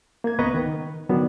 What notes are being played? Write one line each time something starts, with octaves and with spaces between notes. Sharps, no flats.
A#3 G#6
C#2 B3 B4 D#5 A#5 C#6
D#3
D3 D#3 F#3 B3 D4